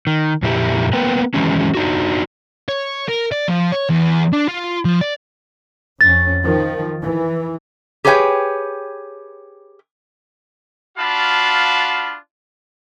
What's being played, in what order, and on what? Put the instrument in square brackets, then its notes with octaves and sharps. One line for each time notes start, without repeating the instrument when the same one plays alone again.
[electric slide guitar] D#3
F2 A#2 E4 G4
A#3 B3 A#4 B4 G5
D#3 E3 F#3 G#3 C#4
D4 D#4 F#4
[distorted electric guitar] C#5
A#4
D5
F3
C#5
E2
D4
F4
F3
D5
[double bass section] F2 C#4 [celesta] A6
[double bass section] D#3 F3
E3
[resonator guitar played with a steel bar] G4 G#4 B4 C#5 F#5 G5
[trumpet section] D4 F4 F#4 F5 A5 B5